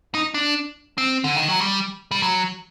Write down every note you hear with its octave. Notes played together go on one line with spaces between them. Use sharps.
D#4
D4
C4
D3
D#3
F#3
G3
G3
F#3